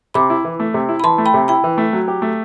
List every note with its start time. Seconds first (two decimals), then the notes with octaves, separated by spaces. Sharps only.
0.14 C3 B5 D6
0.30 E4
0.45 E3
0.60 A3
0.74 C3
0.89 E4
1.00 B5
1.03 E3 A5 C6
1.18 A3
1.26 G5 B5
1.34 C3
1.48 E4 G5 B5
1.64 E3
1.78 A3
1.93 F#3
2.08 G4
2.22 A3